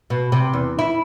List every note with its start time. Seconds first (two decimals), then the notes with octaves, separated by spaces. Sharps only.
0.10 B2
0.32 C3
0.54 E2
0.79 E4